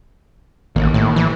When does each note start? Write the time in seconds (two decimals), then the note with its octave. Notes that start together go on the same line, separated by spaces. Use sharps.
0.76 A1 D#3 A#3
0.94 A2
1.16 E3